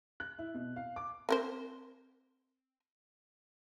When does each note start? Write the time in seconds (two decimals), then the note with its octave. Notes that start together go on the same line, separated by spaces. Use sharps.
0.20 F#6
0.39 E4
0.55 B2
0.76 F5
0.96 D6
1.29 C4 A#4 C5